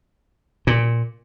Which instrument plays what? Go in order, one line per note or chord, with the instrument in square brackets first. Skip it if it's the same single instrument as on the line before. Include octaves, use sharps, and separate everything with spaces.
[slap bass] A#2